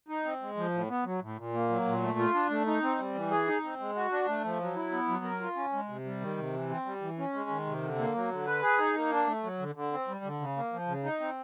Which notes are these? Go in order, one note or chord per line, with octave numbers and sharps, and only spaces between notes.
D#4
C4
G#3
F3
A2
B3
F#3
A2
A#2
A#3
F#3
A#2
A3
F4
D4
A3
D#4
C4
G3
E3
G#4
D#4
C4
G#3
F#4
D4
A3
F3
F#3
E4
B3
F#3
A#4
F4
C#4
G#3
C3
G3
D#3
C3
E3
C4
G3
E3
C#4
G#3
D#3
C3
D3
A#3
F#3
D3
B4
G#4
D#4
A#3
D4
A3
F#3
D3
D3
C4
G3
D3
C#3
A#3
F3
C#3
D#4
C4